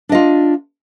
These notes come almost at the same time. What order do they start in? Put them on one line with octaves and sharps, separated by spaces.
D4 D#5 F4